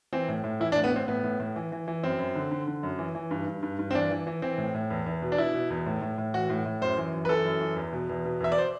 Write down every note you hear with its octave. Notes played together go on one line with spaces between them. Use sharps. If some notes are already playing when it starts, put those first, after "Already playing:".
E3 C4
A2
A2
E3 E4
D4
A2
B3
A2 C4
A2 B3
A2
A2
E3
E3
E3
F#2 C4
F#2
D3
D3
D3
F#2
E3
E3
G2
G2
G2
G2
C4
E3 D4
E3
E3
E3 C4
A2
A2
E2
E2
B2
D4
B2 E4
B2
E2
A2
A2
A2
E3 F#4
A2
A2
F#2 C5
E3
F#2
B4
E3 A4
F#2
E3
E2
B2
E2
B2
E2 E5
D5
C5